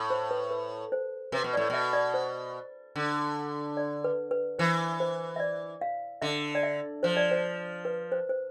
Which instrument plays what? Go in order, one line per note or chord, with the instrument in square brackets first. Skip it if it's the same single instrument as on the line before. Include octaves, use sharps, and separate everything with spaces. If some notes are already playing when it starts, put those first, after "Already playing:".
Already playing: [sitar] A2
[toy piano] C5
B4
B4
C5
[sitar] C3 [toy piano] B4
[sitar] B2
[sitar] A2 [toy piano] D5
[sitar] B2 [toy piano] E5
[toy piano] D5
C5
[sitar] D3
[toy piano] D5
B4
B4
[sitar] E3 [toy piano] C5
[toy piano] C5
E5
D5
F5
[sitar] D3 [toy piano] E5
[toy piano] D5
E5
[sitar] F3 [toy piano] C5
[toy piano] D5
C5
B4
C5
C5